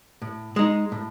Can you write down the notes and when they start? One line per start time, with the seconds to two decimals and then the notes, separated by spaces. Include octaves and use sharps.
0.22 A2
0.56 G#3 D#4
0.92 A2